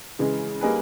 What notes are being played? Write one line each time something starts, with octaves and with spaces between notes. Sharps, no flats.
C#3 E3 G#3
G3 A#3 D#4 G#4 B4